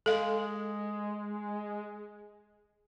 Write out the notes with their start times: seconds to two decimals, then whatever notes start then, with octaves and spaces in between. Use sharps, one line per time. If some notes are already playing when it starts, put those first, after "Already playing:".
0.06 G#3 A4 F5